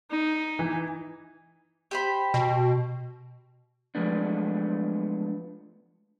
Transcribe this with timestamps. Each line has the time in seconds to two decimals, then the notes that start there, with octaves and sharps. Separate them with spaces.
0.11 D#4
0.59 E3
1.91 G4 C5 B5
2.34 B2
3.95 F3 F#3 G#3 A3 B3 D4